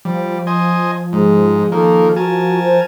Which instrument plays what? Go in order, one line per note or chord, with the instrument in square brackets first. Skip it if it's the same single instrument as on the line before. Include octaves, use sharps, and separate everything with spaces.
[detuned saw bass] F3 [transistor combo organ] G3
[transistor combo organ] C5 D#5 G#5
[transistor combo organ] G#2 [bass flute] G#3
[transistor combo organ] D#3 A#3 [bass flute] A4
[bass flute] F#4 [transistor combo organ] A#4 G#5 A5
[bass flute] C5